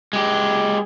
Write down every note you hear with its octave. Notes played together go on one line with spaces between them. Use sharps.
G#3 G4